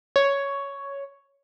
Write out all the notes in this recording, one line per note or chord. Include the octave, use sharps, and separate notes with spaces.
C#5